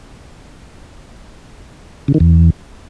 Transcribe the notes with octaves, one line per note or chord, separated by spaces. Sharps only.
C#3
D#3
E2